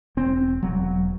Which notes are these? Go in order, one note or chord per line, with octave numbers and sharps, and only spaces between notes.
E1 C4
E1 F#3